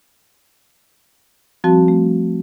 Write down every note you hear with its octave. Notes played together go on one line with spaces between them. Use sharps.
F3 G3 C4 F#4 A5
A3